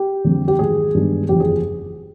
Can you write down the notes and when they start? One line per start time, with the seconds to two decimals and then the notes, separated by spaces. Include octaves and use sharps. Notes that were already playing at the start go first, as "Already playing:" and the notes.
Already playing: G4
0.24 F2 D3 G3
0.48 G4
0.59 G#2 D#3 F#3 G#4
0.95 G2 D#3 G#3 B3 D4
1.29 F#1 E2 C#3 F3 G4
1.40 G#4